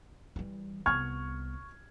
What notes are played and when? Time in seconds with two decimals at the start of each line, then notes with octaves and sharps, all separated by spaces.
0.36 E3 G3
0.86 C2 B3 C#6 F6 G#6